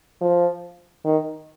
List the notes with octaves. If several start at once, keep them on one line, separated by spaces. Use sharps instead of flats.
F3
D#3